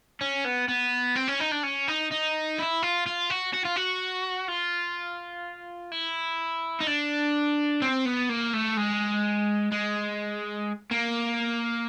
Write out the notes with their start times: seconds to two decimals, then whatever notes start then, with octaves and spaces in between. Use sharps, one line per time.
0.21 C#4
0.45 B3
0.68 B3
1.16 C4
1.28 C#4
1.40 D#4
1.52 D4
1.63 C#4
1.88 D#4
2.11 D#4
2.59 E4
2.83 F4
3.06 F4
3.30 F#4
3.54 F#4
3.65 F4
3.76 F#4
4.48 F4
5.92 E4
6.81 D#4
6.87 D4
7.82 C4
8.06 B3
8.29 A#3
8.54 A3
8.77 G#3
9.72 G#3
10.91 A#3